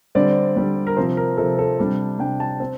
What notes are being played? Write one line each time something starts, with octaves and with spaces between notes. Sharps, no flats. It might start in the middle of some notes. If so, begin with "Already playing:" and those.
D3 G3 C4 D5
D3 G3 C4
A#4
C3 F3 C4 C5
A#4
C3 F3 C4 A4
A4
C3 G3 D4
C3 G3 D4 G5
A5
C4